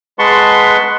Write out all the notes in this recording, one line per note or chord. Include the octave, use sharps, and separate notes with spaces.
G#3 B4 F#5 A5 C6 C#6